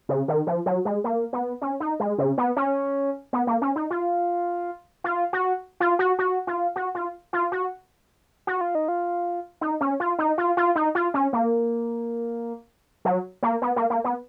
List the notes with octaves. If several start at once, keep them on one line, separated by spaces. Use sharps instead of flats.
C#3
D#3
F3
F#3
G#3
A#3
B3
C#4
D#4
G#3
C#3
B3
C#4
B3
A#3
C#4
D#4
F4
F4
F#4
F4
F#4
F#4
F4
F#4
F4
F4
F#4
F#4
F4
D#4
F4
D#4
C#4
F4
D#4
F4
F4
D#4
F4
C#4
A#3
F#3
A#3
B3
A#3
A#3
B3